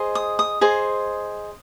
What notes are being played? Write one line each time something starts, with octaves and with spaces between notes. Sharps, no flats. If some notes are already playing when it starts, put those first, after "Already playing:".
Already playing: G#4 C5 D#5
D#6
D#6
G#4 C5 D#5